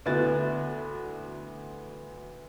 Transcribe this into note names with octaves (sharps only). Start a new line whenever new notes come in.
D2 B3 E4 F#4 A6